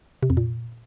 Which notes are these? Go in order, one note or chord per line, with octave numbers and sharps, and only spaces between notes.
C3
F2
A#2